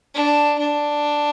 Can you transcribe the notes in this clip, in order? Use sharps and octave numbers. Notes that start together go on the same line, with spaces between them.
D4
D4